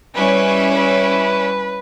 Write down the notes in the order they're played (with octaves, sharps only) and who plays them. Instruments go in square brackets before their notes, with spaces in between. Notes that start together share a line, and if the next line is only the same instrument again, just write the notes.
[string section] G3 C#4 E4 [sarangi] B4
[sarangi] B4